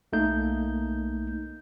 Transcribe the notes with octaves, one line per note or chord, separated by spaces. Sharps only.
B1 A3 A#3 D#4 G6